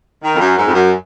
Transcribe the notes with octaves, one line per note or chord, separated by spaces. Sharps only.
D#3
F2
F#2
G#2
F2
F#2